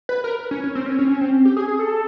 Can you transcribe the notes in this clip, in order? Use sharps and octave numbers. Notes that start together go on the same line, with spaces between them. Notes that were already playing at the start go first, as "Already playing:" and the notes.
B4
A#4
C#4
C#4
C4
C#4
C#4
C4
C#4
C4
G4
G#4
G#4
A4